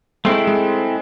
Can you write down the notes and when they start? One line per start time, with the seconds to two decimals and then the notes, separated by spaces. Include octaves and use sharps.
0.25 G#3 A3 C4 E4
0.47 G#3